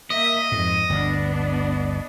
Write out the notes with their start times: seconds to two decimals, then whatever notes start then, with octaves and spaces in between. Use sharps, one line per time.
0.10 A#3 D#5 E5
0.52 F2 G#2
0.90 G1 D2 B3 D4